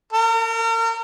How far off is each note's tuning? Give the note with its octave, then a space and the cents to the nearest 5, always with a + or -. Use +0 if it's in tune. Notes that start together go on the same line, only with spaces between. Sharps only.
A#4 -40